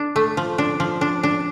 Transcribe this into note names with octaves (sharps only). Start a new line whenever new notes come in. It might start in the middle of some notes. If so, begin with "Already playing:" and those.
Already playing: D4
A3
F3
D4
F3
D4
D4